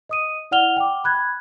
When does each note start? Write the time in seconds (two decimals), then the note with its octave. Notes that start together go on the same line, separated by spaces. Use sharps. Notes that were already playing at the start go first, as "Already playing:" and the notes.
0.09 D#5 D#6 D#7
0.51 E4 D5 F#5 F6 F7 G7
0.77 G5 D6
1.04 B5 F#6 G#6